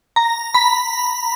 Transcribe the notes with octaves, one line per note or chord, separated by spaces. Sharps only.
A#5
B5